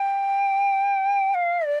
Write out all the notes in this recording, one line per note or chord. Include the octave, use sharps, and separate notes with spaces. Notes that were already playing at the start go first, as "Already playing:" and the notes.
Already playing: G5
F5
D5